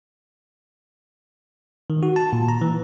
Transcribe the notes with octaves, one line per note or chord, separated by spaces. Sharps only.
D#3
F#4
A5
A#2
A#5
E3